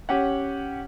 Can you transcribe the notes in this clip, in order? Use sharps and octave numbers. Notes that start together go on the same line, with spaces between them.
C#4 G4 F#5